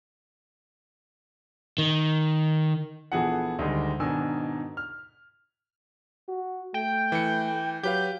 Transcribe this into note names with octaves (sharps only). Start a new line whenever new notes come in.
D#3
A#1 E3 B3 G#4 A4 F#5
D2 D#3 G3 G#3 D#5
G#2 B2 D#3 D4 G#5 E6
F6
F#4
A3 G5
E3 C#7
F#3 G4 B4 F5 G6